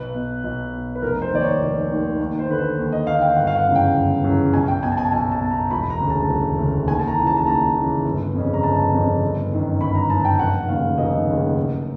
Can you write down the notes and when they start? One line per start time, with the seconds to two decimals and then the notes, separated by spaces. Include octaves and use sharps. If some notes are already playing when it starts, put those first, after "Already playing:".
Already playing: B1 B4
0.14 B2
0.44 B1
0.73 B2
0.95 B4
1.02 F1 A#4
1.22 C5
1.32 D#2 D#3 D5
1.41 C#5
1.61 F1
1.90 D#2 D#3
2.19 D#2
2.39 C5
2.49 D3 B4
2.58 C5
2.78 D#2
2.92 D#5
3.07 D3 F5
3.22 G5
3.36 G1 F#5
3.47 F5
3.56 F#5
3.66 F#2 C#3 E3
3.75 G5
3.95 G1
4.24 F#2 C#3 E3
4.53 B1 G#5
4.68 G5
4.83 B2 G#5
4.92 A5
4.97 G#5
5.12 B1 G#5
5.32 A5
5.41 B2
5.51 A#5
5.71 E1 B5
5.90 A#5
6.00 D2 C#3
6.10 A5
6.29 E1
6.59 D2 C#3
6.88 D#2 G#5
6.99 A5
7.07 A#5
7.17 C#3 E3
7.27 A5
7.37 A5
7.46 D#2 A#5
7.76 C#3 E3
8.05 G1
8.34 F2 C#3
8.54 A#5
8.63 G1 A5
8.93 F2 C#3
9.22 G1
9.52 F#2 D#3
9.81 G1 B5
9.95 A#5
10.10 F#2 D#3 A5
10.25 G5
10.39 F1 F#5
10.68 D#2 C#3 F5
10.98 F1 D#5
11.27 D#2 C#3
11.56 F#1